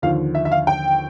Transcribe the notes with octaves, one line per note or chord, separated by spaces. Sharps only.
D#2 D3 F3 F5
E5
E5
F5
G5